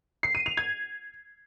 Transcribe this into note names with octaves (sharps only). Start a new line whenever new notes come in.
C7
D#7
F7
G#6